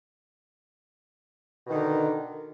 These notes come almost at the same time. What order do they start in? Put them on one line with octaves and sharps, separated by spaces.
B2 D#3 D3